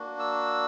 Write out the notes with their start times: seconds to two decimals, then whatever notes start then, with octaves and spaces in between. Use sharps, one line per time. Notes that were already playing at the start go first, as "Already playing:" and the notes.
Already playing: A#3 D4 F#4
0.19 E6